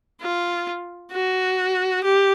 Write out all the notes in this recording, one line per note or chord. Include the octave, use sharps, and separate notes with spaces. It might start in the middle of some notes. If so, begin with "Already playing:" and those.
F4
F#4
G4